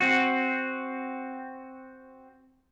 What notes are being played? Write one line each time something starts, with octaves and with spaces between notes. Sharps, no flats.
C4 F#4